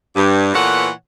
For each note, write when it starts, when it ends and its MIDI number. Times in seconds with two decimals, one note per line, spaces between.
0.16 0.53 43
0.54 0.89 46
0.54 0.89 52
0.54 0.89 59
0.54 0.89 69
0.54 0.89 73
0.54 0.89 78